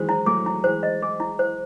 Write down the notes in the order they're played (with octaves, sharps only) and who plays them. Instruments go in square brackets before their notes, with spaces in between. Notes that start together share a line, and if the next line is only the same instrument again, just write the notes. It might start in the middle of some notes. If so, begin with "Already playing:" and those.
Already playing: [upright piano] D#3 E3 F#3 G#3 [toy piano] C5
[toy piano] E4
[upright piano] F#3 A3 [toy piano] G#4
[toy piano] E4
[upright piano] E3 G#3 [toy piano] C5
[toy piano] D#5
G#4
E4
C5